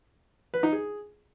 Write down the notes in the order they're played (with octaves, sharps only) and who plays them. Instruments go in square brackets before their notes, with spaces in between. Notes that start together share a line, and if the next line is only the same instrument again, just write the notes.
[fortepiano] B4
D#4
G#4